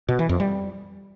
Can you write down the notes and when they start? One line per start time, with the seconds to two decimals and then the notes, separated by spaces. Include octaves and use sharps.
0.09 B2
0.19 E3
0.29 F2
0.40 G3